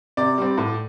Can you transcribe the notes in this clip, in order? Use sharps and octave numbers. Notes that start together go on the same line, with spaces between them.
C3 D5
G3 C4
A2